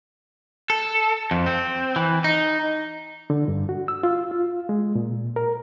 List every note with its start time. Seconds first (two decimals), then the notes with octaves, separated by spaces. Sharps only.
0.70 A4
1.31 F2
1.46 C4
1.96 E3
2.24 D#4
3.30 D3
3.48 G2
3.69 F#4
3.88 E6
4.03 F4
4.31 F4
4.69 G#3
4.95 A#2
5.36 A#4